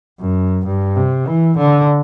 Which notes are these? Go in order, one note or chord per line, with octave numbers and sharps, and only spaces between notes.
F#2
G2
C3
E3
D3